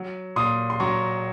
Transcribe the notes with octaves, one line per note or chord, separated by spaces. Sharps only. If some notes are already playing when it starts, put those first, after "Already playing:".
Already playing: F#3
A#2 C6 D#6
C6
F#3 A#5 C#6